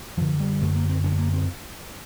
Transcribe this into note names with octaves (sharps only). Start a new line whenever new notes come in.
F#2 D3 F3
G3
F#2 D3 A3
A#3
C4
F#2 D3 C#4
B3
A#3
C4